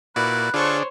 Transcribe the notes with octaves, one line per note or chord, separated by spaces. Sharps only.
A#2 E4 F#4 B4 D5 F#6
D3 D4 F4 G#4 A4 C5 C#5 C#6